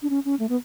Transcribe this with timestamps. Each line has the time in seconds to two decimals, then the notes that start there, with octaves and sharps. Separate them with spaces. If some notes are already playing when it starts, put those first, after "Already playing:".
0.02 D4
0.10 C#4
0.25 C#4
0.39 A3
0.49 B3